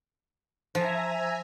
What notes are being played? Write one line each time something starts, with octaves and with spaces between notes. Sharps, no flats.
F3 E5 G#5 A#5